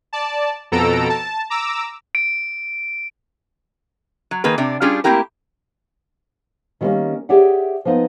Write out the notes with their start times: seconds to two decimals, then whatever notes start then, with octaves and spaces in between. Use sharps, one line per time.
0.13 D5 A5
0.71 F2 B2 A4 A#5 E6 D7
1.09 A5
1.50 A#5 D6 E6
2.15 D7
4.31 F#3
4.44 D#3 A#3 G#4 B4
4.58 C3 D4 D5
4.81 G3 C#4 D4 F4 G4 G#4
5.04 A3 A#3 C4 E4 G4 A#4
6.81 D#3 F#3 G3 A3 A#3 C#4
7.29 G4 G#4 C#5 D5 E5 F#5
7.85 F3 A#3 B3 D#4